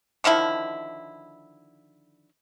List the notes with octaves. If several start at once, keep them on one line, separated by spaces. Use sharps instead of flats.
D3 D#3 F3 E4